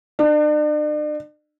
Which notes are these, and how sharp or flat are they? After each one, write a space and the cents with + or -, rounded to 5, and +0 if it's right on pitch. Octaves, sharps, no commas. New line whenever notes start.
D4 +40